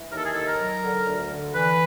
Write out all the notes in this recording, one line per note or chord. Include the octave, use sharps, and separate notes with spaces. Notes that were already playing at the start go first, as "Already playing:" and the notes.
Already playing: E3
D#2 A#4
A4
G#4
D#3 A4
A#4
F#3
D3
D2
D3
E3 B4